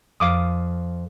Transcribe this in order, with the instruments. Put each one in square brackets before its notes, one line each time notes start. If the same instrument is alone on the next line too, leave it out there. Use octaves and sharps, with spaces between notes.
[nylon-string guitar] F2 [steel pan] F5 D6 D#6